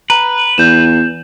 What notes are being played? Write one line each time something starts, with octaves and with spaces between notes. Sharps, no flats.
B4 A#5
E2 G6 E7